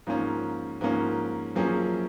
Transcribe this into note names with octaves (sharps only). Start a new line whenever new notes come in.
G#2 F3 A#3 C#4
G#2 F3 A#3 C#4
F#2 F3 A#3 C#4 G#4